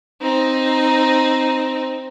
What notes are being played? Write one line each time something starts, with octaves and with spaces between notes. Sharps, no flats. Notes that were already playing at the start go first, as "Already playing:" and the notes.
C4 D#4